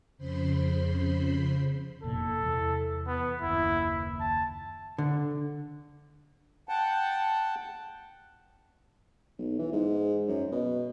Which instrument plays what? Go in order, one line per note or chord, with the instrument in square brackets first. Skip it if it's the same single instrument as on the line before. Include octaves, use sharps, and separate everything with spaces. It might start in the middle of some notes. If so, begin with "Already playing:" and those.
[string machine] F2 C#3 C5 B5 C6
[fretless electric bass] F1 E2 A#2 [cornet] A4
[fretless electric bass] E2 C3 E3
[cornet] B3
[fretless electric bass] F#1 D#2 [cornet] E4
[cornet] A5
[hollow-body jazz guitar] D3
[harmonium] F#5 G5 A5
[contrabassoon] B1
E3
G#2
F#2
B2